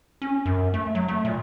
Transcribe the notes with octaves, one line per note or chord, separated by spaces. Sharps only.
C#4
F#2
A3
F#3
A3
A#2